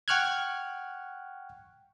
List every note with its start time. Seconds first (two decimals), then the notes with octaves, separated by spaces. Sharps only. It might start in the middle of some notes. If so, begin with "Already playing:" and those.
0.08 F#5 G5 C#6 F6 F#6 G#6